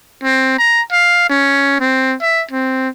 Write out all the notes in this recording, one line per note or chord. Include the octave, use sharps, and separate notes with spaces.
C4
A#5
F5
C#4
C4
E5
C4